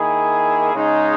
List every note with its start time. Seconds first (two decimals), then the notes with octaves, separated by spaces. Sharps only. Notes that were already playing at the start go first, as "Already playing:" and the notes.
Already playing: D#3 A#3 E4 G#4
0.75 C#3 G#3 D#4